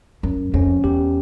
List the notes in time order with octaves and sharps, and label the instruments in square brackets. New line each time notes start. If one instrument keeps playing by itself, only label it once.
[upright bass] F#2
[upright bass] F2 [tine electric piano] C#4
[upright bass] E2 [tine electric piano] G4